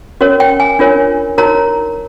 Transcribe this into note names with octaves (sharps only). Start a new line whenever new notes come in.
C#4 F#4 A#4 C#5
G5
G#5
D4 F4 A#4 C#5
D#4 F#4 A#4 C#5 A#5